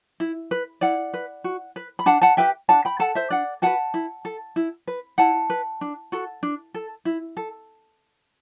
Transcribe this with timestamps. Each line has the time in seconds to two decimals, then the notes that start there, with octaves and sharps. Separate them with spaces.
0.20 E4
0.51 B4
0.81 E4 D5 F#5
1.14 B4
1.44 F#4
1.76 B4
1.99 B5
2.06 D4 F#5 A5
2.22 F#5 A5
2.37 G4 B4 E5 G5
2.69 D4 F#5 A5
2.85 G5 B5
2.99 A4 F#5 A5
3.15 C5 E5
3.30 D4 D5 F#5
3.62 F#4 B4 F#5 A5
3.94 E4
4.25 A4
4.56 E4
4.87 B4
5.18 E4 F#5 A5
5.50 B4
5.81 D4
6.12 F#4 A4
6.43 D4
6.74 A4
7.05 E4
7.37 A4